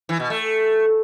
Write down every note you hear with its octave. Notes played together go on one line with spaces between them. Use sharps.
E3
B2
A3